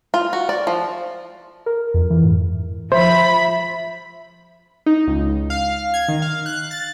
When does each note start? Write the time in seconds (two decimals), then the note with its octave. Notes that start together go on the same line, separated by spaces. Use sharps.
0.14 F4
0.33 F#4
0.49 D5
0.67 F3
1.66 A#4
1.94 F2
2.10 E3
2.23 G#2
2.92 F3 C5 E5 B5
4.86 D#4
5.07 C#2
5.50 F5
5.94 G#6
6.08 D#3
6.22 F5
6.46 F#6
6.71 A6